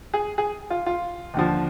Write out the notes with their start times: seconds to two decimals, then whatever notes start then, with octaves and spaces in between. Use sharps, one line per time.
0.14 G#4
0.38 G#4
0.70 F4
0.86 F4
1.34 D#2 D3 F3